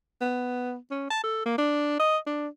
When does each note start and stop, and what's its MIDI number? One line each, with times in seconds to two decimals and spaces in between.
0.21 0.76 59
0.91 1.09 61
1.10 1.20 81
1.23 1.43 69
1.46 1.54 58
1.58 1.96 62
1.99 2.18 75
2.26 2.48 62